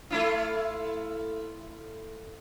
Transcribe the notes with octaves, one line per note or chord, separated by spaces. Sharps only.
A3 E4 F4